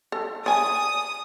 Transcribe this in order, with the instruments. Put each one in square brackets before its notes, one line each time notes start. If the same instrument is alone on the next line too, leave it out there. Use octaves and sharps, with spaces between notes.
[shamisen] A4
[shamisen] D5 G#5 [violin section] D#6